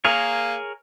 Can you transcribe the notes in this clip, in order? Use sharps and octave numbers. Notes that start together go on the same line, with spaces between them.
A#3 G#4 A#4 C#5